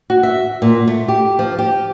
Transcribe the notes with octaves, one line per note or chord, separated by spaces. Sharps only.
F#4
E5
A#2
A3
G4
F3
G4